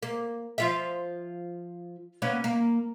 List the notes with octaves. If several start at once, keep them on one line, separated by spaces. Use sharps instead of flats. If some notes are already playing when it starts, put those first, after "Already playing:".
A#3
F3 F4 E5
A#3 B3 C#4
A#3